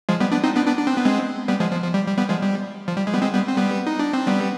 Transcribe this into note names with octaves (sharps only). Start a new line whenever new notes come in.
F3 G#3
G3 B3
B3 D4
C4 D#4
B3 D4
B3 D4
D4
C4
B3
G#3 C4
G3 B3
F3 G#3
F3
F3
G3
G3
G3 B3
F3 G#3
G3
F3
G3
G#3
G3 B3
G#3 C4
G3 B3
C4
G3 B3
D#4
D4
C4
G3 B3